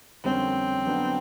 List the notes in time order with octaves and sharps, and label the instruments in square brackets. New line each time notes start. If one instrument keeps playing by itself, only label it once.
[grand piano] F2 D3 G3 A#3 C#4 [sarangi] C4
[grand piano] D3 F#3 B3 D4 F#4